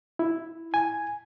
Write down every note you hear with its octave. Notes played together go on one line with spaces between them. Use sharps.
E4
G#5